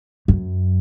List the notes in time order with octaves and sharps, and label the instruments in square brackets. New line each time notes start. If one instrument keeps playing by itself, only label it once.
[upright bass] F#2